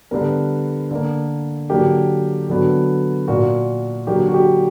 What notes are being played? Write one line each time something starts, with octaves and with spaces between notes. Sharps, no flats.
D3 G3 B3 A#4
D3 A#3
D3 F#3 A#3 G4
D3 F#3 B3
A#2 A#3 F#4
D3 F#3 A#3 G4
F#4
G4